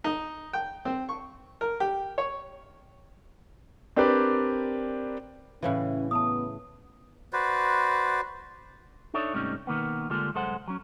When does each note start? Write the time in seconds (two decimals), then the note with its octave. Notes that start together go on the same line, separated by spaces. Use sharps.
0.04 D#4
0.53 G5
0.85 C4
1.09 C#6
1.61 A#4
1.80 G4
2.18 C#5
3.96 C4 D4 G4 A#4 B4 D5
5.62 A2 C#3 E3 C#4
6.11 B3 A5 A#5 D#6
7.33 F#4 B4 C5 D5
9.14 D4 D#4 A4 C#5 D5 E5
9.33 G#2 C3 G3 A3 C#4 D#4
9.67 B2 D#3 A#3 B3
10.10 D3 G3 G#3 A#3 F4 A4
10.34 C2 F#2 G#3 A4 C5 F#5
10.68 F#3 C#4